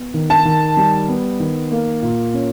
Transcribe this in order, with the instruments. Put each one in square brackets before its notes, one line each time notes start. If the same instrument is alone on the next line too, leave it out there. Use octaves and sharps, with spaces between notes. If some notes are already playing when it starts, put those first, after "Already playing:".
Already playing: [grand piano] B3
D#3
[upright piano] A5
[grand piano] D#3
G3
B3
D#3
A#3
A#2
C#4